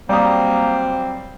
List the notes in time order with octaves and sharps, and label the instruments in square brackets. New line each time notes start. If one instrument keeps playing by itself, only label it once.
[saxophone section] F#3 C4 [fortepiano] G3 D#6 [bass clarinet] A#3